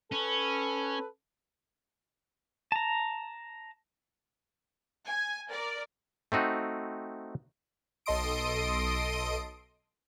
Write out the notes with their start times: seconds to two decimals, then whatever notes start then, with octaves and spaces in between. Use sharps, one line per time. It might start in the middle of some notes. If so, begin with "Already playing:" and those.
0.12 C#4 A4 B4
2.72 A5 A#5
5.07 G#5
5.50 A#4 D5
6.32 A3 C4 D#4 F#4
8.06 B1 A4 D#5 C6 D#6 D7